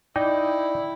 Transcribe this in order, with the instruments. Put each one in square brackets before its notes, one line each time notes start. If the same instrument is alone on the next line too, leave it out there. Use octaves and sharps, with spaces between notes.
[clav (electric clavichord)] D#4 [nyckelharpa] E4 [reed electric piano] D5 G5